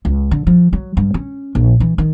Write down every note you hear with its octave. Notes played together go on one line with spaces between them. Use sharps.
C#2
D3
F3
F#3
G2
C#4
A#1
E3
D#3